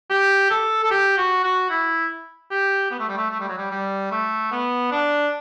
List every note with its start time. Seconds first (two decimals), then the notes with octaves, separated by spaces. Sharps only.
0.10 G4
0.50 A4
0.84 A4
0.91 G4
1.17 F#4
1.44 F#4
1.70 E4
2.51 G4
2.91 B3
2.99 A3
3.09 G3
3.17 A3
3.31 A3
3.40 G3
3.49 F#3
3.58 G3
3.71 G3
4.11 A3
4.52 B3
4.92 D4